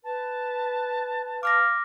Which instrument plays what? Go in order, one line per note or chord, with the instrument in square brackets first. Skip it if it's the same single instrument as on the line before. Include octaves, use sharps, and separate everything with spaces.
[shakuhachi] B4 [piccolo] A5
[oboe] F5 [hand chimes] D6 F6 A#6